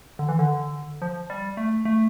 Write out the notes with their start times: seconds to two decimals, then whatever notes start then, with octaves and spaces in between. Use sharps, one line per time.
0.19 D3
0.29 E3
0.39 D3
1.02 F3
1.30 G3
1.57 A3
1.85 A3